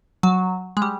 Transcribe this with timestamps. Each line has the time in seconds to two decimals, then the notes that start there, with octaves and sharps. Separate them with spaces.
0.23 F#3
0.77 G#3
0.82 G3